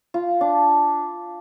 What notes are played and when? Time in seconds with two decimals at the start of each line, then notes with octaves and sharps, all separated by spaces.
0.14 F4
0.41 D4